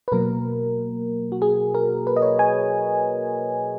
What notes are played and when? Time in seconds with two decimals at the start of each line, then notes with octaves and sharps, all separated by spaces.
0.08 B4
0.12 B2 F#3 A#3 A#4
1.32 F#4
1.42 G#4
1.74 A#4
2.07 B4
2.16 D#5
2.22 C#5
2.39 G#5